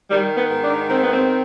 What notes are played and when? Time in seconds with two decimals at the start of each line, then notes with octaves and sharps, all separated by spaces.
0.10 D#3 G3
0.36 B3
0.49 G#2
0.62 D4
0.88 D#3 C4
1.01 B3
1.13 C4